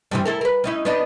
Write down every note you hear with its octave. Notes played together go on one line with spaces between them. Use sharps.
G2 C3 E3
E4 A4 A#4
A#4 B4
C#4 D#4 E4
B3 D4 D#4